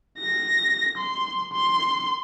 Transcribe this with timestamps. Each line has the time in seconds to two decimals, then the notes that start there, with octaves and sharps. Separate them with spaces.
0.19 A#6
0.98 C6
1.53 C6